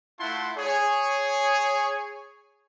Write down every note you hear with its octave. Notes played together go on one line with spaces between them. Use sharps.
A3 E4 F4 F#5 A5 C6
G#4 C#5